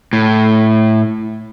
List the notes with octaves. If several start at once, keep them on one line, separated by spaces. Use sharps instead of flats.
A2